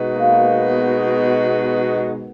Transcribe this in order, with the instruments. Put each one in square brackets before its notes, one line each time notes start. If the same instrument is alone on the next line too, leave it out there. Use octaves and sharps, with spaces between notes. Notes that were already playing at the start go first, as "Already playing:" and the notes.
Already playing: [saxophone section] B2 G#3 D#4 F#4 B4
[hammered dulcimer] A#3
B3